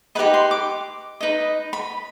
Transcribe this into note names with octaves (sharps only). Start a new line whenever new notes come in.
D#4 G4 B4 D#5 B5
C6
D6
D#4 B4 D#5
B5